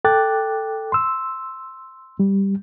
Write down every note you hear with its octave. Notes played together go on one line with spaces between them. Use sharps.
A4 G5 D6 F#6 A6
C6 E6
G3